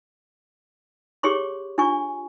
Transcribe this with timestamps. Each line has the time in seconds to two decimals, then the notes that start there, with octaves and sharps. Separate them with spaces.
1.23 G4 G#4 C#5 C6 C#6
1.78 D4 F4 G#5 C#6